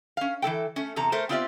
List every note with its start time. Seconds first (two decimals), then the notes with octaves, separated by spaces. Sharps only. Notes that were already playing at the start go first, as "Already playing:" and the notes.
0.17 C#4 F5
0.42 E3 A#3 A4 G5
0.76 A3 C#4
0.96 E2 C3 A4 A#5
1.12 A3 A#4 C5
1.29 B3 C4 F4 G4 D5 E5